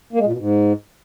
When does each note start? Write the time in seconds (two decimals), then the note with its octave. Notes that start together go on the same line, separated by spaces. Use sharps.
0.13 A#3
0.19 G#3
0.26 A#2
0.32 B2
0.38 G#2